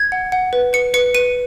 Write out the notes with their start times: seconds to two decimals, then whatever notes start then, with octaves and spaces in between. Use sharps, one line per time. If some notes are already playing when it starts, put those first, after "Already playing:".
Already playing: G#6
0.12 F#5
0.32 F#5
0.53 B4
0.73 B4 C#7
0.94 B4 C#7
1.15 B4 D#7